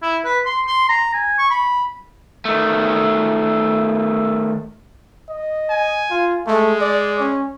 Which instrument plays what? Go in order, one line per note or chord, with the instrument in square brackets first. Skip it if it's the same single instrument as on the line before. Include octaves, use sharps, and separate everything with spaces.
[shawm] E4
B4
C6
C6
A#5
G#5
C#6
B5
[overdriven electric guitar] D#3 A3
[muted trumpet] D#5
[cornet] G#5
[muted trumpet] F4
[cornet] G#3 [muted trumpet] A3
[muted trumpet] D5
C#4